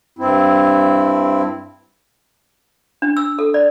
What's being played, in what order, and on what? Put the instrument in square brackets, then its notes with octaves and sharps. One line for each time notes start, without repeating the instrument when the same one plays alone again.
[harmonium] G2 C4 E4
[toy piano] D4
E6
A4
D5